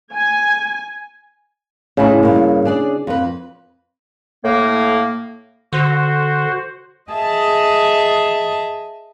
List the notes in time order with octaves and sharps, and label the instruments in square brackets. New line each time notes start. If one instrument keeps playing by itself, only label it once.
[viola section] G#5
[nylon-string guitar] A2 D#4 E4 [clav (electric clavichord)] C#3
[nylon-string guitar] G2 A#3
D4 G#4 D5
F2 B4
[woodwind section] A2 A#3
[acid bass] D3 [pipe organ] F#4 C5
[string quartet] G#4 D#5 E5 A5